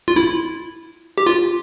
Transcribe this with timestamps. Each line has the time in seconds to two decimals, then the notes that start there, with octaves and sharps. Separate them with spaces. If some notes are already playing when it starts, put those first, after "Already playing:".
0.08 F4
0.16 E4
1.18 G4
1.27 F4